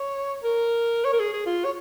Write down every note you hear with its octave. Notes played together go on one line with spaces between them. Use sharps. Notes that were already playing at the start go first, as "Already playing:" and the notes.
Already playing: C#5
A#4
C#5
A#4
G#4
G#4
F4
C#5